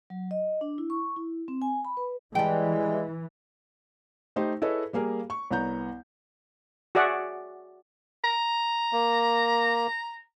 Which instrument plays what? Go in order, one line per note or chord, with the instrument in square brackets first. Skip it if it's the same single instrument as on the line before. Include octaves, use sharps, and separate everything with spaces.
[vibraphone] F#3
D#5
D4
E4
C#6
E4
C4
G#5
B5
B4
[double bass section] E3 [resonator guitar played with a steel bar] G3 G5 [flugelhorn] G#3
[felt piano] A3 D#4 G4 C5
E4 G#4 A4 B4 C#5 D#5
G3 A#3 G#4 A#4
C#6
C2 B3 C#5 A#5 G6
[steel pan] F#4 G#4 D5 E5 F#5
[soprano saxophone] A#5
[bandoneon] A#3